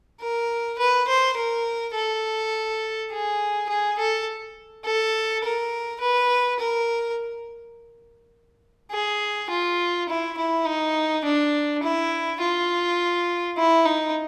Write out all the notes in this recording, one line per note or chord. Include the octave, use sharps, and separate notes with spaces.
A#4
B4
C5
A#4
A4
G#4
G#4
A4
A4
A#4
B4
A#4
G#4
F4
E4
E4
D#4
D4
E4
F4
E4
D#4